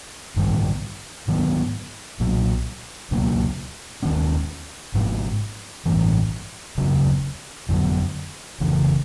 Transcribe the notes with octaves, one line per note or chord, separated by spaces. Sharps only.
A1 G2 D#3 G3
G#2 D#3 F#3 B3
B1 A#2 F#3
C#2 B2 F#3 A#3
D#2 D#3 G#3 C#4
G#1 G#2 F3 G#3
A1 G2 E3
E1 D2 C#3 F#3
F2 D3 F#3
F1 F2 C#3 E3